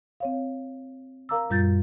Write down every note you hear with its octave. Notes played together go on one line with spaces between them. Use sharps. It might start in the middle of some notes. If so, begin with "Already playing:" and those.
C4 C#5 F5
A#4 F5 A#5 D6 E6
F#2 A#2 G3 F4 G6 A6